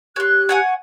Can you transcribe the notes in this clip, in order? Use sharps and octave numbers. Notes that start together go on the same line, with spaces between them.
G4 C#5 C6 F#6
C#5 F#5 G#5